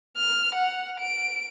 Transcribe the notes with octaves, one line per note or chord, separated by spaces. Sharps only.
F6
F#5
D7